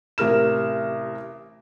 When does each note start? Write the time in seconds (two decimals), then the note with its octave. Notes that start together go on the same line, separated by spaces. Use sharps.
0.18 A1 C3 A#4 F6 E7